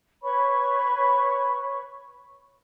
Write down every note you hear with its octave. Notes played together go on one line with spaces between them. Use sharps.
B4 C#5 B5 C#6